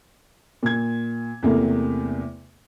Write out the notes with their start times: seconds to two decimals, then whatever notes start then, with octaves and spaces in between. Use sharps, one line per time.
0.63 A#2 G#6
1.43 E2 C3 A3 A#3